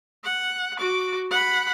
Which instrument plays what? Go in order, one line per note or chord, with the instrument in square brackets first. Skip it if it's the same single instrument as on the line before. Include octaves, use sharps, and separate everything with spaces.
[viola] F#5
F#4 D6
F#5 B5